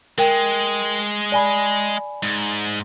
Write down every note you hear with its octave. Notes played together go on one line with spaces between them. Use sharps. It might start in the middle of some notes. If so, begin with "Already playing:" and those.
G#3 A#4 G5
D5 G#5 B5
G#2